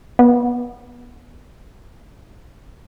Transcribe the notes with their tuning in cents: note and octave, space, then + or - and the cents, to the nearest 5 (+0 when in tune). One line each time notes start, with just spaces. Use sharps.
B3 -20